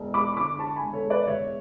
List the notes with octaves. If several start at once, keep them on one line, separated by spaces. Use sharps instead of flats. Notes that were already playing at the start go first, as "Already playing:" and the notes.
Already playing: E1
G#3 B5 D6
C#6
D3 B5 D6
D3 A5 C#6
G#5 B5
E1
A4 C#5
G#3
B4 D5
E1 C#5 E5